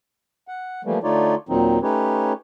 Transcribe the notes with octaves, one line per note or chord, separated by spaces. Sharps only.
F#5
E3 F3 G3 A3 A#3
D3 A3 D#4 F4 C#5 D5
D#2 A#2 D#3 F#3 C4 D#4
A3 C#4 D#4 G4 B4 C#5